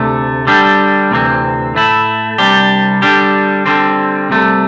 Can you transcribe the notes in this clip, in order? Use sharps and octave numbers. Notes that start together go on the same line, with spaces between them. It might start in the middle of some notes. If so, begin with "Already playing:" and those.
Already playing: D2 C3 A3
D3 G3 D4 G4
D2 C3 E3 C4
A2 A3 E4
C2 C3 G3 D4 G4
D3 G3 D4 G4
D3 G3 C4
C2 C3 A3